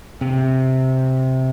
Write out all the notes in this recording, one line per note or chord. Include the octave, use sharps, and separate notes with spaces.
C3